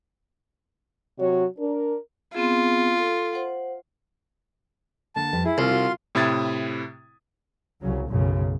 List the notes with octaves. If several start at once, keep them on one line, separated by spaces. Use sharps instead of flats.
C3 F#3 F#4 C#5
D4 A#4
B3 C4 F4 G#4
A4
C5 F#5
D3 A#3 A5
F2 G3 B4
E4 G#4
C2 F4 F5 C6
F#4
A2 C3 E4 D#6 G#6 A6
C2 C#3 F#3
B1 F#2 C#3